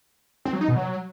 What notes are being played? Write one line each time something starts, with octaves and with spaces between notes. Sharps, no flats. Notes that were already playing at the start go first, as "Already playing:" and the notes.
C4
F#3
D#4
B2
F#3